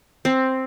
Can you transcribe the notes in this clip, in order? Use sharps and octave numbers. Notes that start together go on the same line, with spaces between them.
C4